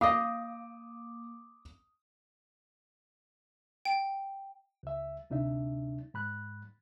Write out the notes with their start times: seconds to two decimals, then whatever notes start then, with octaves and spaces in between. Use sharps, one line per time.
0.01 A#3 D#5 F5 D6 D#6
3.85 G5
4.83 C#2 E5
5.30 D2 C3 D4 D#4 E5
6.14 G#2 B5 F#6